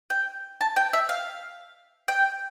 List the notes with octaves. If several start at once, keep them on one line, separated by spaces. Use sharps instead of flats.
G5
A5
G5
E5
F5
G5